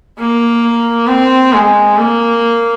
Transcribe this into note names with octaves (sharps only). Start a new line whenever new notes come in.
A#3
C4
G#3
A#3